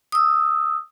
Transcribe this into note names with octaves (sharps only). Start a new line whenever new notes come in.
D#6 E6